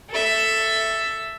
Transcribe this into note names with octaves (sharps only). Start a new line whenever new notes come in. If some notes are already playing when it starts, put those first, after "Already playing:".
A4 E5